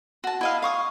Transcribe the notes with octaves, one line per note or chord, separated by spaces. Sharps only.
F#4 A5
E4 D#5 F5
F5 C#6 D#6